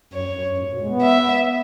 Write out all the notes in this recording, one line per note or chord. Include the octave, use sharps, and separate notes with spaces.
F#2 C#5
F#2
F#2
G#2
B2
G#3
B3
E5